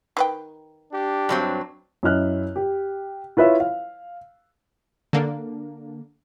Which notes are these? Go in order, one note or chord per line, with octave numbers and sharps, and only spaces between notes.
D#3 B4 G5
D4 G4
G2 F#3 C4
F#2 E4 D#5 F6 F#6
G4
E4 F4 B4 C#5 E5
F5
D3 A#3 D4